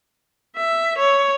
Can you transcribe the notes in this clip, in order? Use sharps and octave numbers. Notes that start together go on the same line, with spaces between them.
E5
C#5